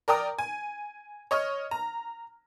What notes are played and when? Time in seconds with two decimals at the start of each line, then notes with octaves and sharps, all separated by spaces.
0.08 A#4 D5 G5 A#5 D#6
0.39 G#5
1.31 C#5 D#5 C#6 F6
1.71 A#5